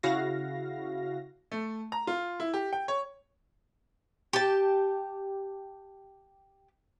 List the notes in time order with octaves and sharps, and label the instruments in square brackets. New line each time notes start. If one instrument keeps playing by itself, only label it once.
[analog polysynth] C#3 E4 F#4 F5 A#6
[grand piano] A3
A#5
F4
E4
G4
G5
C#5
[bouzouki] G4 A5